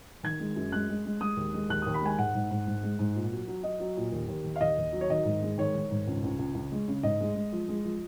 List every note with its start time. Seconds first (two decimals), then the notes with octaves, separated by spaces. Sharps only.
0.23 D#3 G#6
0.40 G#3
0.56 F#2
0.72 G#3 F#6
0.89 G#3
1.05 G#3
1.21 G#3 D#6
1.37 D#2
1.54 G#3
1.69 D#2 F#6
1.82 D#2 D#6
1.94 B5
2.01 G#3 G#5
2.18 G#2 F#5
2.34 G#2
2.51 G#2
2.67 G#2
2.83 G#3
2.99 G#2
3.15 A#2
3.32 F#3
3.48 F#3
3.63 F#3 D#5
3.80 F#3
3.97 A#2
4.12 D#2
4.28 D#2
4.44 D#3
4.56 F5
4.61 D#2 D#5
4.78 D#2
4.93 F#3
5.01 C#5
5.10 D#3 D#5
5.25 G#2
5.42 G#3
5.58 D#3 C#5
5.75 D#3
5.91 G#2
6.07 C#2
6.23 C#2
6.39 C#2
6.55 C#2
6.72 G#3
6.88 C#3
7.03 G#2 D#5
7.21 G#3
7.36 G#3
7.52 F3
7.68 G#3
7.84 F3